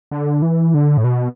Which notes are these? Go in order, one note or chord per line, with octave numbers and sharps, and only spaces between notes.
D3
E3
D3
A2
B2